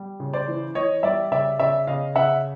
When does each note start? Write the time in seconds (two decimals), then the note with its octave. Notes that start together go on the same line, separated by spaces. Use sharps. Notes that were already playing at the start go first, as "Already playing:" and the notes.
Already playing: G3
0.20 C#3
0.33 C5 D5
0.48 E3
0.75 E3 C#5 D#5
1.03 G3 D5 E5
1.32 C#3 D5 E5
1.59 C#3 D5 E5
1.87 C#3 D#5 F5
2.16 C#3 E5 F#5